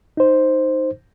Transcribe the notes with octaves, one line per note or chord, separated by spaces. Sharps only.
D#4 C5